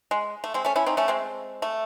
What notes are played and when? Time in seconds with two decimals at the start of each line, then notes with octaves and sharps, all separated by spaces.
0.11 G#3
0.44 A3
0.54 G#3 C4
0.65 A3 C#4
0.76 C#4 E4
0.86 C4 D#4
0.97 A3 C#4
1.08 G#3 C4
1.62 A3